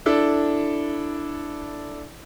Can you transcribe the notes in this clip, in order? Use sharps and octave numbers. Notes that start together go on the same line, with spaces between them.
D4 E4 A4